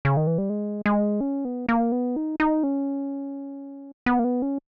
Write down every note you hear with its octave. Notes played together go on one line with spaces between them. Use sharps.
C#3
D#3
E3
G3
G#3
G#3
C#4
B3
A#3
B3
D#4
D#4
C#4
B3
A#3
B3
C#4